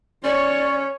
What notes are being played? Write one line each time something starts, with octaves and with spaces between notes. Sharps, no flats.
C#4 C#5 D5